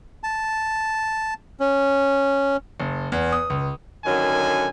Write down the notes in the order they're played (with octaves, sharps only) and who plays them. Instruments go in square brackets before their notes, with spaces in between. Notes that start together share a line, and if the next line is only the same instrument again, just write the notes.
[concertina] A5
C#4
[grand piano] F#1
E2
D#6
C#2
[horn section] F#2 D3 D#3 F#3 G#5